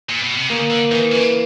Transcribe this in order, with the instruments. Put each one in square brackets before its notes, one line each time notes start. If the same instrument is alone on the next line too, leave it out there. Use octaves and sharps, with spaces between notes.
[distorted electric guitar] A#2
B2
C3
[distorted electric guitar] C#3 [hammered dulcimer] A#3
[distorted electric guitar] D3
[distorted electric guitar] D#3 [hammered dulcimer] E3
[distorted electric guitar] C#3